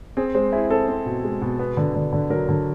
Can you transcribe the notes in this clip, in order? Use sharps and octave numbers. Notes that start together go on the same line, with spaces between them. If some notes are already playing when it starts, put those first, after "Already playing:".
C4 G#4
G#3 C5
E4 G#4
C4 A4
C4
B2
G#3
B2
B3
D3
D3
D3
F#3 A#4
D3